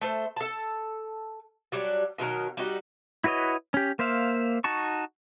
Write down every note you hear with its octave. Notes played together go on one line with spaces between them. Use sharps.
A3 A4 C5
A4 A5
F#3 G3 D4
B2 D#3 F#3 A#4
G3 D#4 F#4
E4 F#4 B4 C#5 D#5
C#4 G4
A#3 C5 E5 F5
D#4 F#4 A5 C#6